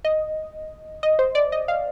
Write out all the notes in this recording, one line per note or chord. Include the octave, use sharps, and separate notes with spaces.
D#5
D#5
C5
D5
D#5
F5